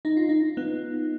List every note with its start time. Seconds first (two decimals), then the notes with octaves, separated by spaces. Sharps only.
0.05 D#4
0.17 F4
0.29 D#4
0.57 B3